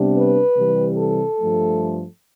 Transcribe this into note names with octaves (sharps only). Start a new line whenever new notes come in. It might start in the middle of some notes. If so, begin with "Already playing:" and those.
Already playing: C3 G3 B3 D4
B4
C3 E3 G3
A4
G2 F3 A3